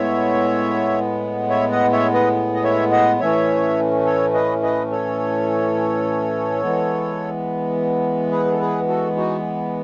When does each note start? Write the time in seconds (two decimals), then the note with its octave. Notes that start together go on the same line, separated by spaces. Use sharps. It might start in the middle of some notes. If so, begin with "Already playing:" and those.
Already playing: A2 G#3 B3 C#5 E5
1.50 C#5 E5
1.71 D#5 F#5
1.92 C#5 E5
2.14 B4 D#5
2.54 D#5
2.64 C#5 E5
2.92 D#5 F#5
3.20 A2 E3 A3 C#4 C#5 E5
4.05 A4 C#5
4.34 B4 D#5
4.63 B4 D#5
4.91 A4 C#5
6.62 E3 G#3 B3
8.31 G#4 B4
8.45 G#4
8.52 A4
8.60 G#4 B4
8.88 F#4 A4
9.17 D#4 F#4